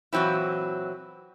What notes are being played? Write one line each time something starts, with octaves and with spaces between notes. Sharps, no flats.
A#2 E3 F#3 C4 E4